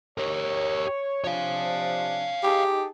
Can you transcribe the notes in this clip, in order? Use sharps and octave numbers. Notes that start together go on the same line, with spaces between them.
G4 A#4 C#5
C3 F3 D4 C#5 F5
D#4 G4 G#4 A5